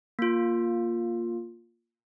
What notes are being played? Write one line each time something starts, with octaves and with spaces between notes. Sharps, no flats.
A#3 F4